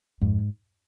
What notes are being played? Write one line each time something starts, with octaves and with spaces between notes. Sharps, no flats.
F2 G#2